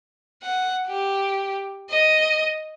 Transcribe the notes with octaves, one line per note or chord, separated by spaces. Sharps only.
F#5
G4
D#5